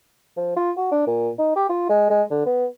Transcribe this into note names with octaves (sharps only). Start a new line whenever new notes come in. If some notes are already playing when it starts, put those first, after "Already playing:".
F3
F4
F#4
D4
A#2
D#4
G4
F4
G#3
G#3
D3
B3